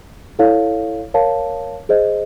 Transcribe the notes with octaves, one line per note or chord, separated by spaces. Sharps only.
E4 A4 C#5 F5
A#4 C#5 F5 A5
G#4 C5 D#5